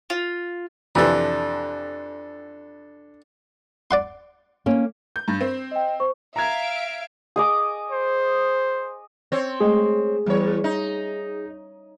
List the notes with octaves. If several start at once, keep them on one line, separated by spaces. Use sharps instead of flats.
F4
F2 C3 E3 D4 A4
D5 F#5 C6
A#3 C#4
G6
G2
C4
D#5 G5
C5 C#6
E5 F5 A#5 G#6 D7
G#4 D#5 D6
C5
C4 C#5
G#3 A3 G#4 D#5
E2 G3 C#5
D#4